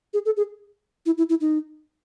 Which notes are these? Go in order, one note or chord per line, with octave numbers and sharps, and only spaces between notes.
G#4
A4
G#4
E4
E4
E4
D#4